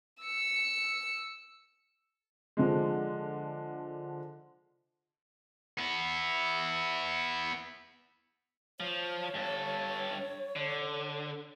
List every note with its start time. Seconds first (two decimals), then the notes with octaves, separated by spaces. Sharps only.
0.22 E6 C#7
2.57 D3 F3 G#3
5.79 B3 E4
8.80 F3 C#5
9.35 G2 A4
10.56 D3